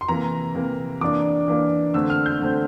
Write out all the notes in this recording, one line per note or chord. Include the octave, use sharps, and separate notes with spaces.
C6
C3 E3 A#3 A#5
C3 E3 A#3
E3 A#3 D4 D6
E3 A#3 D4
D3 A3 C4 E6
F6
G6
D3 A3 C4